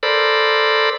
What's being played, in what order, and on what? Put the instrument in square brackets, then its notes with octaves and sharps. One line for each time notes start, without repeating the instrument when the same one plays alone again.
[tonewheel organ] A4 A#4 C5 D5 B5